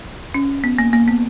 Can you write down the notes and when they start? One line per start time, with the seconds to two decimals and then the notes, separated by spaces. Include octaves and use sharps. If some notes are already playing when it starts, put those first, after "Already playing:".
0.34 C#4
0.64 B3
0.79 A#3
0.93 A#3
1.08 B3